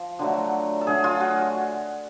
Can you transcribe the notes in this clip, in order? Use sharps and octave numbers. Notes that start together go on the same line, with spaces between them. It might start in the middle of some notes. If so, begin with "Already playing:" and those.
Already playing: F3 F4
D3 F#3 A3
A4
D3 F#3 A3 G#4
F4
F#4